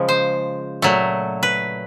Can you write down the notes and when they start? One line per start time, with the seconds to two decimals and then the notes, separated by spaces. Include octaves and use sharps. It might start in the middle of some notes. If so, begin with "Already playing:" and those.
Already playing: C#3 F3 G#3
0.09 C5
0.82 A#2 F#3 A3
1.43 B4